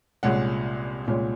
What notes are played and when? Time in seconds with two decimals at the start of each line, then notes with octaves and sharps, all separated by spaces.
0.23 C2 A#2 G#3 C#4 F#5
1.07 C2 A#2 G#3 C#4